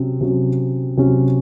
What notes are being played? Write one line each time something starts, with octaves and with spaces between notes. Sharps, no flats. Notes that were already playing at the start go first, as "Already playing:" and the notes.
Already playing: C3 F#3 C#4
C3 F#3 C#4
C3 F#3 C#4